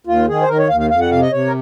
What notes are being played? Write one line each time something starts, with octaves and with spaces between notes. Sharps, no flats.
D#2 F4
D#3 G#4
C5
D#3 A#4
C#5
D#2 F5
F5
F2 F5
F#5
C3 F5
D#5
C3 C#5
A#4